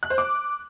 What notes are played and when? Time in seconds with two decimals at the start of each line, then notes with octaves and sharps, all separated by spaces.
0.03 F#6
0.10 C5
0.18 D6